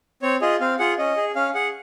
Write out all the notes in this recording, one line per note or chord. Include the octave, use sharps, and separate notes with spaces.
C4 C#5
F4 G#4 D#5
C4 F5
F4 G#4 F#5
C#4 D#5
G#4
C#4 F5
G#4 F#5